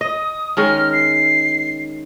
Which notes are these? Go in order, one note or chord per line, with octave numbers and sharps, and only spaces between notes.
D#5 D#6
D#3 G#3 C#4 F6
C7